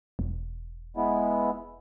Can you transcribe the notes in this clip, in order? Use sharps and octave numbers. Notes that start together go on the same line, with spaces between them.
E1
G#3 B3 E4